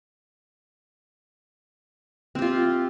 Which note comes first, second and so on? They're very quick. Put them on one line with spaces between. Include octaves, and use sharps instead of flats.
C4 G4 F4